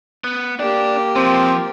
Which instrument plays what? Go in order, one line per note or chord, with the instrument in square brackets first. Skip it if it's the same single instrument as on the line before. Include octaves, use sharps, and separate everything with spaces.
[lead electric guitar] B3
[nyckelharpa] A#3 G4 [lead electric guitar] D4 D5
[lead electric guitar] F3 [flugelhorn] C4